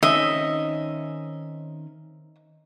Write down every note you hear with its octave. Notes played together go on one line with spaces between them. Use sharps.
D#3 C4 C#4 D#5 E5